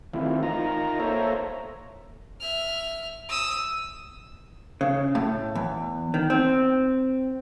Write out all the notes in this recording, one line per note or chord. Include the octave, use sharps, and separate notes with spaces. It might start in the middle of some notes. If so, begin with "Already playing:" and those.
D#3 E3 A3 C4 E4 F4
D#4 F4 A#4 A#5
A#3 A4 C5 C#5 E5 A#5
E5 F6
D#6 E6
C#3
A2
E2
D#3
C4